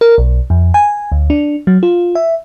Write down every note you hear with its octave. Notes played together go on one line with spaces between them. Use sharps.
A#4
B1
F2
G#5
D2
D4
F#3
F4
E5